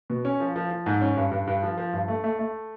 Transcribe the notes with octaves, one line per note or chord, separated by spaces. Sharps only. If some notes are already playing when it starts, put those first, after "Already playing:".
B2
C#4
F3
F3
F3
G#2
C#4
G2
G2
G2
F3
F3
G2
A3
A3
A3